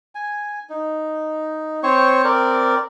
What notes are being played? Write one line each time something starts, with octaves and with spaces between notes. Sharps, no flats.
G#5
D#4
C4 C5 C#5 C#6
C4 A#4 D5